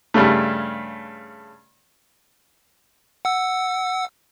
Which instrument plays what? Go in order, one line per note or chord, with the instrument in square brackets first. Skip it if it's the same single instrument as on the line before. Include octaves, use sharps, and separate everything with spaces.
[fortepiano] G2 C#3 A3
[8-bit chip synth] F#5 E6